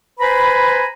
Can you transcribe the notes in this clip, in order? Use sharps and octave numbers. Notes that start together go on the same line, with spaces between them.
B4 C5 G#5 A#5 B5